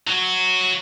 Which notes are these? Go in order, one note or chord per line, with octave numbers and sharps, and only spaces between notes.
F#3 F#4